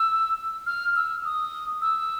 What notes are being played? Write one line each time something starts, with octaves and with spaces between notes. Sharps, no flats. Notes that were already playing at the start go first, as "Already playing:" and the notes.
Already playing: E6
F6
E6
D#6
E6